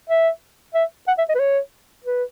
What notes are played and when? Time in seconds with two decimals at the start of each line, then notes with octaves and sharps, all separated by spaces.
0.09 E5
0.74 E5
1.08 F#5
1.18 E5
1.29 D#5
1.35 B4
1.39 C#5
2.04 B4